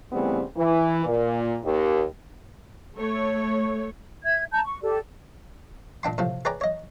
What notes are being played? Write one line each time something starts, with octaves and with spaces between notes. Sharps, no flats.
C#3 E3 G3 A3 B3 C4
E3
A#2
D#2
A3 C#5
E5 G#6
A5 A#5 G6
C#6
G4 A4 D5
A#2 D4 G5 C6
A2 C3 F3
G#4 B4 C#5 D5 G5 A#5
C#5 D#5